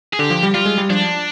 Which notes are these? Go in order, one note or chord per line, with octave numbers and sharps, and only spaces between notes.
G#4
D3 G4
F3
G3
G3 F4
G#3
G3
F3 D4